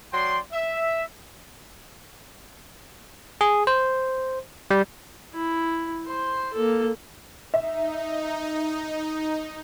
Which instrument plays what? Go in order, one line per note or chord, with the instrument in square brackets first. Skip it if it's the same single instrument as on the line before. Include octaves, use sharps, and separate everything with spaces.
[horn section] F#3 D5 G5 C6
E5
[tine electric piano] G#4
C5
G3
[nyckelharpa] E4
C5 C6
A#3 A4
[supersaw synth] D#4 [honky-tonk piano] E5